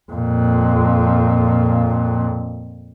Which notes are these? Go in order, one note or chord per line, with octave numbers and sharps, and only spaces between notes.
F2 A#2